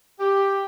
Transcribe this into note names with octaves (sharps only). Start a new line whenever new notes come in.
G4